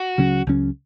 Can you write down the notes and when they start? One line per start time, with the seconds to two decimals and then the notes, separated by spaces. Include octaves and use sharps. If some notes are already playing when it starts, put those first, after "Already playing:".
Already playing: F#4
0.18 C#2 C#3 F#3 C#4
0.46 C#2 C#3 F#3 C#4